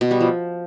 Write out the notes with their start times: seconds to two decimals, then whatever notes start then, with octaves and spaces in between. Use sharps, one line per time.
0.01 B2
0.11 G3
0.21 F3